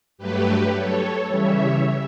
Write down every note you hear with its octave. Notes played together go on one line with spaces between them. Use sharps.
G2 F#3 A3 G4 B4
A4 C#5
C#3 E3 G3 C#5 E5